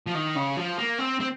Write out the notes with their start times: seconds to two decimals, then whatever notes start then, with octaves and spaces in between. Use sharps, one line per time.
0.07 F3
0.15 D#3
0.36 C#3
0.57 F3
0.78 A#3
0.99 C4
1.20 C4